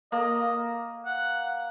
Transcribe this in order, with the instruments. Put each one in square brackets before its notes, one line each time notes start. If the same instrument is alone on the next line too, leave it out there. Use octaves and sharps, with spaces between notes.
[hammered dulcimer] A#3 [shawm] D#5
[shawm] F#5